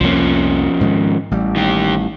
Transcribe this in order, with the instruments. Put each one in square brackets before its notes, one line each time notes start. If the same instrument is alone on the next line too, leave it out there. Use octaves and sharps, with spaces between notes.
[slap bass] C2 F2 A#3 [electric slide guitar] F3 C#4
[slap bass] G#2 D#3 G#3
A1 G3
[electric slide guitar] D#3 G4